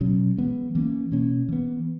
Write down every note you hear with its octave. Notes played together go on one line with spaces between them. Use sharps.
B2 F#3 C#4
E3 G#3 B3
E3 A#3 C#4
B2 A#3 C#4
E3 B3